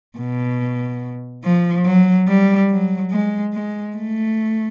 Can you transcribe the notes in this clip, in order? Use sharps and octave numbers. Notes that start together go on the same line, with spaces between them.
B2
F3
F#3
G3
F#3
G#3
G#3
A3